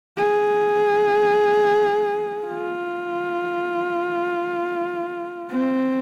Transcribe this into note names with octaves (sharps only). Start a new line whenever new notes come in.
G#4
F4
C4